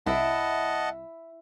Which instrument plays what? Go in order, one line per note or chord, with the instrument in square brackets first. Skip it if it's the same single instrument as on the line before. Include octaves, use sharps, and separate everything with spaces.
[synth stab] C2 [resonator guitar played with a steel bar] E4 [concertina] D#5 F#5 A5